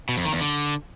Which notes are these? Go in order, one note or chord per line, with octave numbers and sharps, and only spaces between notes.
B2
F2
D#3
E2
D3